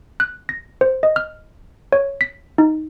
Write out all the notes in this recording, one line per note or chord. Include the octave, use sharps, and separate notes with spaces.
F#6
A#6
C5
D#5
F6
C#5
B6
D#4